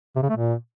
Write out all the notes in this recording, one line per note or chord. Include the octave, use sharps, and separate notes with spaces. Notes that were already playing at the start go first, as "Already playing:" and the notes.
C3
C#3
A3
A#2